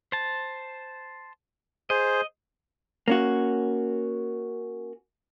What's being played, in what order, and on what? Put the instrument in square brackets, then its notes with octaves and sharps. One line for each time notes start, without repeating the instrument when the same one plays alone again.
[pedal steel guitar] C5 A5
[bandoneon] G#4 C5 [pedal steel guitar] D#5
[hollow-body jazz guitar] A#3 C#4 F#4